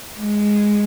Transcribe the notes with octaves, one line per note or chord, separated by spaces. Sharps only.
G#3